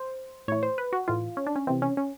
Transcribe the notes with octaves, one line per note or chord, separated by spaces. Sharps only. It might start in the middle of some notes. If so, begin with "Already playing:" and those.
Already playing: C5
A2 E3 C#5
C5
B4
F#4
A2 E3 F4
C#4
D4
C#4
C3 E3 C4
C#4
C#4